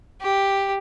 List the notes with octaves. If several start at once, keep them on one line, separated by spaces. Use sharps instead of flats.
G4